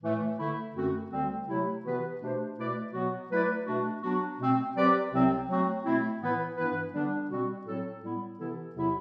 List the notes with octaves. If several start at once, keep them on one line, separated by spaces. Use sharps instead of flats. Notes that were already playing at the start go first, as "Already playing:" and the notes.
A2 E3 A3
D3 A3 E4
F#2 D3 A3 C4 F#4
D2 D3 G3 C4
C3 F#3 A3 E4
C3 E3 B3 F#4 B4
B2 A3 D4 G4 C5
B2 A3 E4 B4 D5
B2 F#3 B3 F#4
F#3 A3 E4 B4 D5
B2 A3 D4 F#4
F#3 B3 D4 F#4
B2 A3 C4
F#3 C4 G4 B4 D5
C2 C3 F#3 C4
F#3 A3 C4 F#4
B2 A3 C4 E4
A2 E3 B3 E4 B4
G2 E3 B3 E4 B4
D3 G3 B3 D4
B2 G3 C4 F#4
A2 F#3 C4 E4 A4
A2 G3 B3 E4
C3 E3 B3 E4 A4
E2 C3 F#3 B3 E4